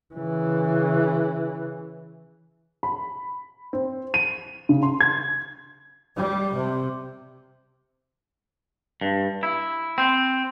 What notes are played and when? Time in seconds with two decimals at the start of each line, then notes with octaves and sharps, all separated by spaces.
0.14 C#3 E3
2.83 B5
3.73 C4
4.14 D#7
4.69 C#3
4.83 C6
5.00 G#6
6.18 G3
6.56 C3
9.01 G2
9.43 E4
9.98 C4